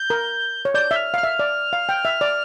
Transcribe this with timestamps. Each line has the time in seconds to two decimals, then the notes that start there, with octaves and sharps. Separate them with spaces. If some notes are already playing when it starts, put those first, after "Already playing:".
Already playing: G6
0.10 A#4
0.65 C#5
0.74 D5 G6
0.91 E5
0.96 F6
1.14 F5 F6
1.23 E5
1.39 D5
1.73 F5
1.89 G5
2.05 E5
2.21 D5